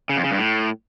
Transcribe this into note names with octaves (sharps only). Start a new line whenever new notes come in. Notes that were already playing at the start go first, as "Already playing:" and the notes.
C#3
F2
C#3
G2
A2